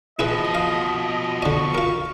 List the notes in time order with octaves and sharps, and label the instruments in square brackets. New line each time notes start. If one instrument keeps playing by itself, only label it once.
[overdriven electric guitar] B2 F3 [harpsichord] E4 G#4 B4 [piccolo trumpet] D#5
[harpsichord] F5
[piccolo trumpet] D#5
[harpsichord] D3 D#5 [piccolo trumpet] C#6
[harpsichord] F4 A#4